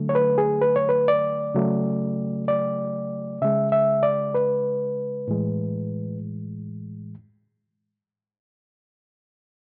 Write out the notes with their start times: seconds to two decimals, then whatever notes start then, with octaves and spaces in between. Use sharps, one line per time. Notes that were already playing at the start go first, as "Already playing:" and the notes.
Already playing: D3 F#3 A3
0.09 C#5
0.15 B4
0.38 G#4
0.62 B4
0.76 C#5
0.89 B4
1.08 D5
1.54 C#3 F#3 A3
2.48 D5
3.41 C#3 G#3 E5
3.72 E5
4.03 D5
4.34 B4
5.28 A2 E3 G#3